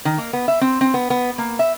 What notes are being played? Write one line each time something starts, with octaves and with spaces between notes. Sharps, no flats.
D#3
A#3
B3
E5
C4
C4
B3
B3
A#3
E5